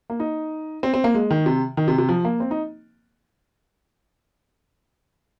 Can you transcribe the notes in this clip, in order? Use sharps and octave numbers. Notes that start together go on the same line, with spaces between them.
A#3
D#4
C4
C4
A#3
G#3
D#3
C3
D#3
C3
C3
F3
A#3
C4
D#4